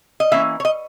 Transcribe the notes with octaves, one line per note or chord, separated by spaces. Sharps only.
D#5
E3 A#3 C#4 E5
C#5
D#5